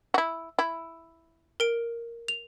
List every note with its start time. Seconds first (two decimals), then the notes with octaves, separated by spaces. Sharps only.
0.14 E4 F#4
0.59 E4
1.60 A#4 D7
2.28 F7